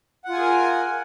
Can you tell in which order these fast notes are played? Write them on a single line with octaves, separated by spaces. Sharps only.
F#5 F4 G#5 G#4 A#4